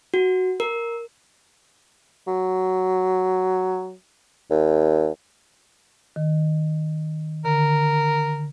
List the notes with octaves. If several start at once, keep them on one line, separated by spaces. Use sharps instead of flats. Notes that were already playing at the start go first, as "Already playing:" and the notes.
F#4
A#4
F#3
D#2
D#3
D3 A#4